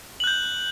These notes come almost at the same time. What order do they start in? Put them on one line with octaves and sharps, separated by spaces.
F#7 F#6 G6